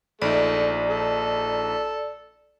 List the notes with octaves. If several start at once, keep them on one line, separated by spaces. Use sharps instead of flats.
A#1 A3 D#4 D5
A4